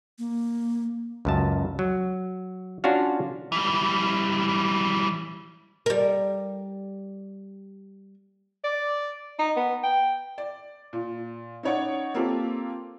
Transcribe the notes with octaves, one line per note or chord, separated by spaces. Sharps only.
A#3
C#2 F#2 A5
F#3
C#4 D4 F4 F#4 F5
E3 G3
G3 A#4
D5
D#4
B3
G5
D5
A#2
C#4 D#4 C#5 D5 F#5
A#3 C4 F4 G4 A4